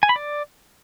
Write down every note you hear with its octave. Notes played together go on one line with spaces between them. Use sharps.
G#5
B5
D5